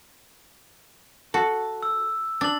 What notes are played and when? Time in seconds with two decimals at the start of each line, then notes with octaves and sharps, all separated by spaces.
1.34 F#4 A4
1.83 E6
2.41 D4 A6 F#7